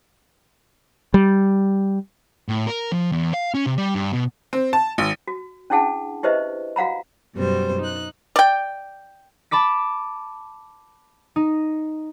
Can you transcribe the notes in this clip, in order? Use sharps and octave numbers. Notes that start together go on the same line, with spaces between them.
G3
A2
A#4
F3
E2
F5
C#4
C3
G3
G2
B2
C4
A5
G#1
F#4
C#4 D4 E4 G#4 F#5 A5
E4 G4 B4 C5 D#5 E5
F#4 F5 F#5 A#5 B5
F#2 B2 G3 C5
D#4 F#6
D5 G5
A5 B5 D6 B6
D#4